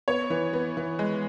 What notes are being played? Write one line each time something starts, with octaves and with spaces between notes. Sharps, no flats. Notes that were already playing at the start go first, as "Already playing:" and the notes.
B3 C#5
E3
B3
E3
G#3